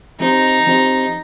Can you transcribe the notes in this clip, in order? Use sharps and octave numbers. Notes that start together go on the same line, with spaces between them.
F3 C4 D#4 G4 C5 D#5
F3 C4 G4 C5 D#5